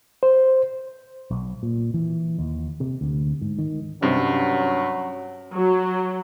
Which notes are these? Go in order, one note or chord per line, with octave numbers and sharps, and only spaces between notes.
C5
B1
A#2
E3
D#2
C3
D2
G#2
D#3
G2 C3 F#3 C#4
F#3